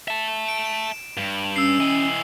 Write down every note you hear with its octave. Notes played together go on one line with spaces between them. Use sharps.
E5 A5
D7
E7
G2
C#4 E6 C7
E3 D#5